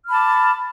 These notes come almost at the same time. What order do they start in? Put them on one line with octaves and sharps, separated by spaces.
F6 B5 A5 D6